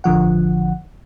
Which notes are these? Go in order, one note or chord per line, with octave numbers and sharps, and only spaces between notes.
A1 D3 F3 F#5